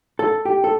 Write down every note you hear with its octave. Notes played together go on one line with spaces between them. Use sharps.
A4
G4
A4